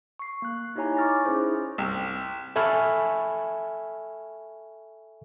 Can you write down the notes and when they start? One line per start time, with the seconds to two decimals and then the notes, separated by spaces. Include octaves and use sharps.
0.19 C#6 C7
0.42 A#3 F#6
0.76 D#4 E4 G4 C#5 G#5 A#5
0.97 C#6 D6 F6 A6 A#6
1.25 C#4 D#4 E4 G#4 C5
1.78 C2
2.56 A4 E5 G#5 B5 C#6 F6